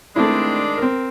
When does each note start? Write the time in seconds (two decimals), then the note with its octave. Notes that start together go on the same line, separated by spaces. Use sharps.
0.16 D#3 G#3 A3 C4 D4 E4
0.78 C4 A#4